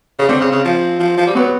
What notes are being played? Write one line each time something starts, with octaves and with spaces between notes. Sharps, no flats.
C#3
D3 C4
C#3
C#3
F3
F3
F3
G3
F#3 B3